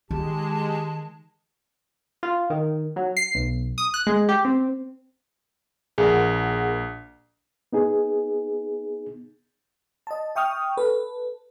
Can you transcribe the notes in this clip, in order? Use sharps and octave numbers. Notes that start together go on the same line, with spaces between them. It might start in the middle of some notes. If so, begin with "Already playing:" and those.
D#3 G#3 G4 A5
F4
D#3
F#3
C7
B1
D#6
F#6
G#3
G4
C4
A#1 G#4 A#4 F#5
B3 D#4 G#4
D#5 A5
E5 G5 C#6 D#6 F6
A4 B4